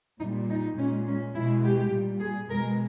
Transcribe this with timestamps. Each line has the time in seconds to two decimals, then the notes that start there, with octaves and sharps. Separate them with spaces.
0.20 A#2 D#4
0.25 G3
0.49 D#4
0.77 A#2 G#3 C#4
1.06 C#4
1.34 B2 G#3 E4
1.63 G4
1.91 A#2 G3
2.20 G#4
2.49 B2 G#3 A#4